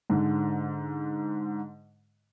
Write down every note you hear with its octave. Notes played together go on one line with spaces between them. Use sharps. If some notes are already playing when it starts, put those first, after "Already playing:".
G#2 D3